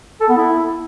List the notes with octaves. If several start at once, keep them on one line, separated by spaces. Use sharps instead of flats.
A4
B3
E4